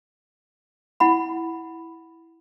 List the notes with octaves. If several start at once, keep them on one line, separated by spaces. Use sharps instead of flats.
E4 F#5 B5